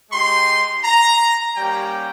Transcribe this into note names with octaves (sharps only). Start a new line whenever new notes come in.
G#3 D#4 G4 C6
A#5
G3 A#3 C#4 G4 G5